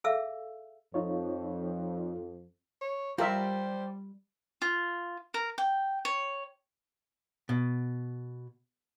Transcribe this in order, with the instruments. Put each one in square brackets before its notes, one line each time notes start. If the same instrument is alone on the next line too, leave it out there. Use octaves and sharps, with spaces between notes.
[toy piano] G#4 A4 E5 F5 E6
[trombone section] F2 [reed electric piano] D#4 F4 C#5
[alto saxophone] C#5
[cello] G3 [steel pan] F4 A#4 E5 [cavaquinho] G4 D5 [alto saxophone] C5
[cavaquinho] F4
A#4
G5
C#5
[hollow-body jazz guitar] B2